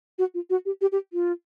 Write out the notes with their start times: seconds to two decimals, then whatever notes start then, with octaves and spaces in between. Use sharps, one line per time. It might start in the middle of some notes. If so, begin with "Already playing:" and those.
0.19 F#4
0.34 F4
0.50 F#4
0.66 G4
0.81 G4
0.92 G4
1.13 F4